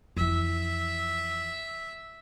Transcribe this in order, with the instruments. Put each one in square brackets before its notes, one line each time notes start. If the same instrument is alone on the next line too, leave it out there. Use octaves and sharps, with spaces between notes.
[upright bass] F2 E3 [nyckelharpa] E5